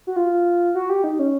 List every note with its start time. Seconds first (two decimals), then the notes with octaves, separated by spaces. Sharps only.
0.07 F#4
0.16 F4
0.75 F#4
0.90 G4
1.04 D#4
1.19 C#4